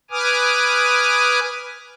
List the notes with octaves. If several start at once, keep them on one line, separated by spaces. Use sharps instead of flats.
B4 G#5 D6 D#6 F6